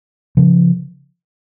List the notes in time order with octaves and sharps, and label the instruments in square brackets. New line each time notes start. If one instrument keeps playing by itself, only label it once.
[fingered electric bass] C#3 F3